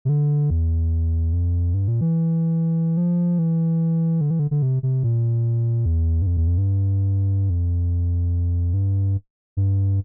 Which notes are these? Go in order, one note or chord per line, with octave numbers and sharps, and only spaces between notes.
C3
D3
E2
F2
G2
A#2
E3
F3
E3
D3
E3
D3
D3
C3
C3
A#2
E2
G2
F2
E2
F2
G2
F2
G2
G2